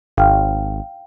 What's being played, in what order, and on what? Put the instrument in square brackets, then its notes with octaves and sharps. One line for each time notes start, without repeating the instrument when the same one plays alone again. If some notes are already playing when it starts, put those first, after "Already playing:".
[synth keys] G#1 [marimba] F5 G5 F6